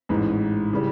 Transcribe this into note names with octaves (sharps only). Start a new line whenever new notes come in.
A1 G#2 E3
C#3 E3 G3